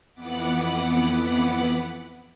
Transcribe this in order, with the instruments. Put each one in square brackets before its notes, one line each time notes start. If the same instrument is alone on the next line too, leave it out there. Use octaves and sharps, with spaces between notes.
[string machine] F2 E3 B3 F#5 B5 D6